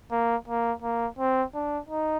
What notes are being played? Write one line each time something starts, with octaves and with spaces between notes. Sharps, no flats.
A#3
A#3
A#3
C4
D4
D#4